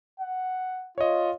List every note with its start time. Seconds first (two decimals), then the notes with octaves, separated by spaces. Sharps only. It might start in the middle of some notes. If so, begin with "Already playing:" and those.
0.20 F#5
0.98 F4 C#5 D#5